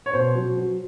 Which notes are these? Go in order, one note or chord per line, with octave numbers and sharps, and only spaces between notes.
C#5
B2 C5
F#3
F#3